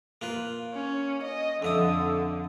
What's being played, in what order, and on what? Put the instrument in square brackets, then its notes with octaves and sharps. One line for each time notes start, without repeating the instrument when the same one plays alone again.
[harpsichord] A#3 F4 B4
[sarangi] C#4
D#5
[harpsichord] F2 E5 D#6 [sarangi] D3